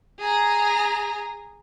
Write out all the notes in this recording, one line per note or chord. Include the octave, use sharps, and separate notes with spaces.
G#4 A#5